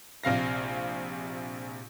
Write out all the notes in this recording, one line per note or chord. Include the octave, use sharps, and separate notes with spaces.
A#1 C3 F5 A#6